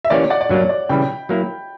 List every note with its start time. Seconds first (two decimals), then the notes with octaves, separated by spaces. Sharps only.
0.05 E5
0.10 E3 A#3 C#4 G4 C#5 D5
0.30 D5 F#5
0.41 D5
0.49 G2 F#3 A#3 D4 C#5
0.69 D5
0.89 C#3 E3 G3 G5 B5
1.29 F#3 A#3 E4